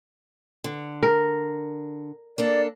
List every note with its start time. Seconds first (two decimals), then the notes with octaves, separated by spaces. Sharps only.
0.64 D3
1.03 A#4
2.38 A#3 D4 A4 D5